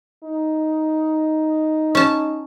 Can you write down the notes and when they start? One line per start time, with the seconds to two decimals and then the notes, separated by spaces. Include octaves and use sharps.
0.23 D#4
1.95 C#4 A5